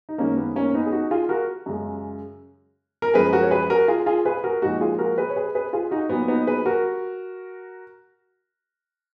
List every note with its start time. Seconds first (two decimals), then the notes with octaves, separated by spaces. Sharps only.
0.09 D#4
0.18 F#2 D#3 G#3 A#3 C#4
0.37 B3
0.56 A#3 C#4
0.74 B3 D#4
0.86 G#4
0.92 D#4 F#4
1.11 F4 G#4
1.29 F#4 A#4
1.66 F#2 C#3 G#3
3.02 A#4
3.14 F#2 F3 G#3 G#4 B4
3.32 F#4 A#4
3.43 C#5
3.51 G#4 B4
3.70 F#4 A#4
3.88 F4 G#4
4.06 F4 G#4
4.25 G#4 B4
4.44 F#4 A#4
4.62 A#2 F3 G#3 D#4 F#4
4.81 F4 G#4
4.99 F#4 A#4
5.18 G#4 B4
5.29 C#5
5.36 G#4 B4
5.55 G#4 B4
5.73 F4 G#4
5.91 D#4 F#4
6.09 A#2 F#3 B3
6.28 B3 D#4
6.47 G#4 B4
6.66 F#4 A#4